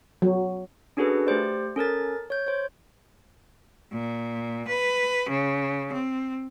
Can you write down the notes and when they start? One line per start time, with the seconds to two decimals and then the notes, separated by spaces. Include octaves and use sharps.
0.22 F#3
0.97 C#4 D4 F#4 G#4 A4 B4
1.27 A3 G4 C5 D5
1.76 C#4 A4 A#4 A6
2.30 C#5 G6
2.47 C5 C#5
3.92 A#2
4.66 B4
5.28 C#3
5.92 C4